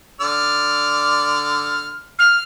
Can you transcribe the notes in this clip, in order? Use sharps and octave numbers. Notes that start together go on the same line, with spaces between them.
D3 D5 F6
F6